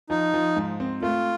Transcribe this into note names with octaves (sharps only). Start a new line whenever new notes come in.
F3 D#4
F3
G#2
C4
A3 F4